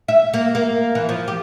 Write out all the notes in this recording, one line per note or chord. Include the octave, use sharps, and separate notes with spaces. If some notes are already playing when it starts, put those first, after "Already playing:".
E5
A#3
A#3
E3
F3
G4